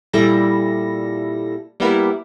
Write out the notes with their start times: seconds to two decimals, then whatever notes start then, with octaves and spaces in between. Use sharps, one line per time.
0.13 A#2 G3 E4 A4 A#6
1.80 G3 A#3 B3 E4 G4 A#4